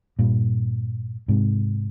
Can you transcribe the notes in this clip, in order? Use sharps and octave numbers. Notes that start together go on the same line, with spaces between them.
G2 A#2
G#2 C3